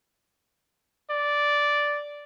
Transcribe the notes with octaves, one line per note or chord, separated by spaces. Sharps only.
D5